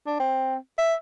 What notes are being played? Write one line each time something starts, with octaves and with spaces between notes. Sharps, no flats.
D4
C4
E5